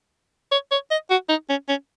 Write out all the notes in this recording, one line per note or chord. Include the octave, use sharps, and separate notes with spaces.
C#5
C#5
D#5
F#4
D#4
C#4
C#4